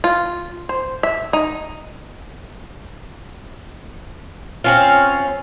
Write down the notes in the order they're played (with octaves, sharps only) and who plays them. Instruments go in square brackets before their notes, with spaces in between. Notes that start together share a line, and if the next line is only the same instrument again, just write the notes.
[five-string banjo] F4
C5
E5
D#4
[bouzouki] C4 C#4 F4